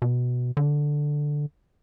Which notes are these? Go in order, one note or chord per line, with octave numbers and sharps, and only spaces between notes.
B2
D3